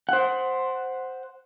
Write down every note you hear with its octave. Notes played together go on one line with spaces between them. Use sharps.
C5 F#5